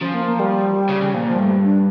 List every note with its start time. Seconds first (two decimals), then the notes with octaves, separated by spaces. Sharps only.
0.01 F3 C#4
0.14 A#3
0.26 A#3
0.40 G3
0.89 C#3
1.02 C#3
1.14 A#2 F3
1.27 F3
1.34 G2
1.39 A3
1.64 D4